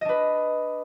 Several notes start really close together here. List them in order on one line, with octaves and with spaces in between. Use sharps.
D#5 D4 B4